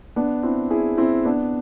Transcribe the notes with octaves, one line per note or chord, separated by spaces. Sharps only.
B3 D4
C4 E4
E4 G#4
C4 E4
B3 D4